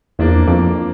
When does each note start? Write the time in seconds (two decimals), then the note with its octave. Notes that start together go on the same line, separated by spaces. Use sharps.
0.19 E2 F3 A#3 D4
0.48 F2